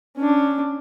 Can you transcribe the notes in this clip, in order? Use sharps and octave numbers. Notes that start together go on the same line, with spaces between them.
C#4 D4